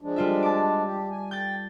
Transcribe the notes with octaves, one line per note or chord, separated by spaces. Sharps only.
F3 G#3 D4
G3 F4 E5
A5 D6
G4
G#5
G5 G6 A6